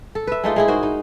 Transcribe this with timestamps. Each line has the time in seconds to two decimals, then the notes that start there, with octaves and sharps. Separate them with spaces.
0.15 A4
0.27 B4 E5
0.44 G#3 A3 D#4 F4
0.56 G#3 E4 G#4
0.68 G#2 F#4 A#4 C5
0.83 D#4